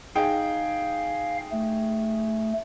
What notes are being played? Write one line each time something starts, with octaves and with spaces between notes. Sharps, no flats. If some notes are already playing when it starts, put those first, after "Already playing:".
D#4 G#4 F5 G5
A3